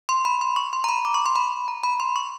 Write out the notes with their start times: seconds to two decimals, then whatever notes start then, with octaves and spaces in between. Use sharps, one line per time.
0.09 C6
0.25 B5
0.41 C6
0.56 C#6
0.73 C6
0.84 A#5
0.89 B5
1.05 D6
1.14 C#6
1.26 C6
1.36 B5
1.68 A#5
1.83 B5
2.00 C6
2.16 C#6